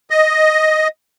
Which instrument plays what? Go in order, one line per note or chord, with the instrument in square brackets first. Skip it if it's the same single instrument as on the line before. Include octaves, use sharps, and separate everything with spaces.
[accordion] D#5